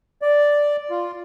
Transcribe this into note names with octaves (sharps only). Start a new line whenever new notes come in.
D5
F4